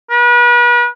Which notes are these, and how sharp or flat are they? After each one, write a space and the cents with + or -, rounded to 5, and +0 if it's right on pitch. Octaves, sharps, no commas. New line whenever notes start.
B4 -40